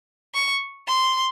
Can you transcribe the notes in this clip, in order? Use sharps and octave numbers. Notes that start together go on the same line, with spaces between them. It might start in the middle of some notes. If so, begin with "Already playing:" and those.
C#6
C6